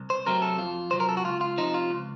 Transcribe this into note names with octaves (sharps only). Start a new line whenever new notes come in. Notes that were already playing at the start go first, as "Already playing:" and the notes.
Already playing: C2
C5
C3 F#3 A3 C4 A#4
A4
F2 F4
C3 F#3 C5
A#4
A4
F#4
C#2 F4
F4
C3 F3 D#4
F4
C#2